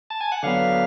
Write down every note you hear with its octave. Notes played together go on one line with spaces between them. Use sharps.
A5
G#5
F#5
D3 F#3 B3 F5